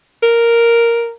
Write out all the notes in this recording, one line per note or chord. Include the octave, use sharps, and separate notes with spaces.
A#4